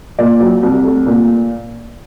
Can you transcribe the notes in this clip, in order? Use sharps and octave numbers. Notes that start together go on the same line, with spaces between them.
A#2 D5
F#3
C2
A3
A#2